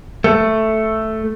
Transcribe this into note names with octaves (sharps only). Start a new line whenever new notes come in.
A3